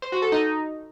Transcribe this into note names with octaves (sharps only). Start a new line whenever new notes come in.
C5
F#4
A4
D#4